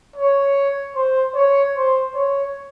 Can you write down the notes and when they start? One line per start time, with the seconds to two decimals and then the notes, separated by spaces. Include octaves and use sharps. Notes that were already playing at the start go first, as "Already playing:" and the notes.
0.16 C#5
0.96 C5
1.35 C#5
1.76 C5
2.15 C#5